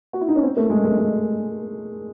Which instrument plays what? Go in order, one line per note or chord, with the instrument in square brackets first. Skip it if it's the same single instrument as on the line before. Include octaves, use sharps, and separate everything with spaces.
[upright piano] F#4
E4
D#4
C#4
C4
A3
G#3
G#3
G#3